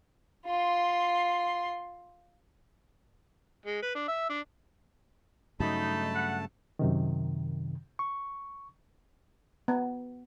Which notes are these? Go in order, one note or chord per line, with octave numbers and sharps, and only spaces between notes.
F4 C6
G#3
B4
D4
E5
D4
G2 C#3 F#3 A3 D#4 A5 B5
F#5
F#2 C3 D#3
C#6
B3